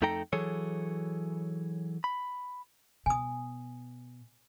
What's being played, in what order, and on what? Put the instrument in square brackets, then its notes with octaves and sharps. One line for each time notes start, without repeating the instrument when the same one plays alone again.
[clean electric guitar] F2 A3 D#4 A4 G5 A#5
E3 F#3 G#4 A4 C#5
B5
[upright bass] B2 [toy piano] G#5 D#6